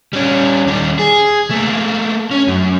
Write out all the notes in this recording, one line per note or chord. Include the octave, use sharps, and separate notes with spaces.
G3 C#4
D#2 G3
G#4
A3 A#3
C#4
F#2